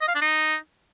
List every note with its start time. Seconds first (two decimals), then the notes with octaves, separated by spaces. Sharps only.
0.01 D#5
0.08 F5
0.15 D4
0.22 D#4